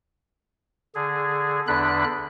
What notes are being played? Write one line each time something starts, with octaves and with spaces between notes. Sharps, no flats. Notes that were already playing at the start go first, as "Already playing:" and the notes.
D3 G#4
E2 D3 D4 B5 F#6